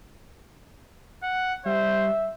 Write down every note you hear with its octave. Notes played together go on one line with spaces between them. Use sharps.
F#5
G3 C5 E5